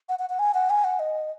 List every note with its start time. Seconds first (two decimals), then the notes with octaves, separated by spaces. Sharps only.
0.09 F#5
0.19 F#5
0.30 F#5
0.39 G#5
0.54 F#5
0.70 G#5
0.84 F#5
0.99 D#5